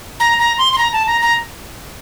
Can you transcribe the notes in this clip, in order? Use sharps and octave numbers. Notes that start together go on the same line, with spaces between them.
A#5
A#5
C6
C6
A#5
A5
A#5
A#5